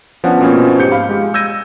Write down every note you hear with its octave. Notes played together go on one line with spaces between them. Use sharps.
F3 B3 C#4 D4 F#5
B2 F3 A#3 C4 C#4
G#2 G4 G6 C#7
F5 B5
G#3 G4
E6 G6 G#6 A#6 D#7